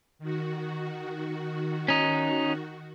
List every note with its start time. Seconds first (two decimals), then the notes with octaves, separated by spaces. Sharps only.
0.19 D#3 F#4
1.88 C#4 D#4